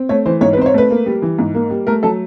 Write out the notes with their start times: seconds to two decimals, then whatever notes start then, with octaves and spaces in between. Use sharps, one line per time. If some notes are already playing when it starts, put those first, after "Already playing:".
Already playing: C4
0.09 A3 C#5
0.26 E3 C5
0.41 G#2 C#5
0.53 B4
0.57 C4 C5
0.66 C#5
0.74 A3 B4
0.91 A#3
1.06 G3
1.22 E3
1.39 G#2
1.54 A#3
1.70 G3
1.87 A3 A#4
2.03 F#3 A4